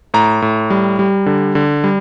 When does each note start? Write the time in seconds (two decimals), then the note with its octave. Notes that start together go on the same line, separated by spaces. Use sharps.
0.14 A2 A#5
0.42 A2
0.70 G3
0.99 G3
1.26 D3
1.55 D3
1.84 G3